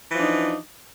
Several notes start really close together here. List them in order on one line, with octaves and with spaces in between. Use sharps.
E3 F3 D4 D#4